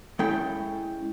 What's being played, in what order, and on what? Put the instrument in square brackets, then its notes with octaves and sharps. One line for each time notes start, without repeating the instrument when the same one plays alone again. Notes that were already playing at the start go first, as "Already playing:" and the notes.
[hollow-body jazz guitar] G#3 C#4 E4 A4 G5